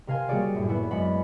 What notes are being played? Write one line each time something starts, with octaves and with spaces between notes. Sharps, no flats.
C3 A#4 F5 G#5 C6
G3 A#3 F#4 G#4 C#5 D5
F#2 A2
B3 E4 F#4
F#2 G#3 F#4 F#5 B5